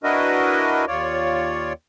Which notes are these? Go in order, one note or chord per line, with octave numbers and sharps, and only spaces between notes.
D4 E4 F#4 A#4 B4 D#5
D#2 F4 C#5 D5